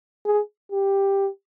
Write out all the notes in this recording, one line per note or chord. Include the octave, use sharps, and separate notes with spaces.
G#4
G4